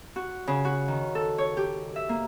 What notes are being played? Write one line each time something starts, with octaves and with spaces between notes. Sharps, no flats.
F#4
C#3
F#4
D#3
A4
C#5
G4
E5
A#3